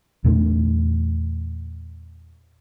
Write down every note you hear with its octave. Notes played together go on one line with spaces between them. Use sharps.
E2 A#2 A3 D4